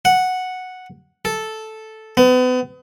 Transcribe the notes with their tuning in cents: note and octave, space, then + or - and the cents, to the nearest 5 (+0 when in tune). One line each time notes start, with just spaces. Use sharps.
F#5 -5
A4 -5
B3 +35